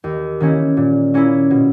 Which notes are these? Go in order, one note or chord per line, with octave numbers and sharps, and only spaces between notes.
D#2
D#3 A#3 C#4 E4
A#2
A#3 C#4 E4
B2